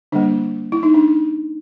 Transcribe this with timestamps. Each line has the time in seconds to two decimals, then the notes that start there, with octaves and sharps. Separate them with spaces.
0.12 D3 G3 A#3 D4
0.72 E4
0.83 D#4
0.94 D4